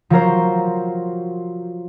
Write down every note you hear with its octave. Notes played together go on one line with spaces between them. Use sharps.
F3 F#3 A#4 C5